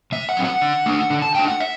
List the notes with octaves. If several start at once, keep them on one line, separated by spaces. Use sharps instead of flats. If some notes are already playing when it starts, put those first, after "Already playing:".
C3 E5
F#5
F#3 C4
F#5
D3
A3 D4
D3
A5
A3 D4 G5
F#5
E5